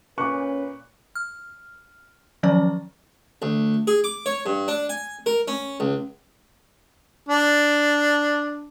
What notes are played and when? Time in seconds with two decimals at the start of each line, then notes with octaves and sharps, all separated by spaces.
0.18 A#2 C#4 B4 C#6 D6 F#6
1.16 F6
2.43 D#3 F3 F#3 C#4 D5
3.42 D2
3.87 G#4
4.04 D6
4.26 C#5
4.46 G2
4.68 D4
4.89 G#5
5.26 A#4
5.48 C#4
5.80 C#2
7.29 D4